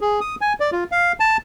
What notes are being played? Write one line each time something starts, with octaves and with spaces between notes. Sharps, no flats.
G#4
D#6
G#5
D5
F4
F5
A5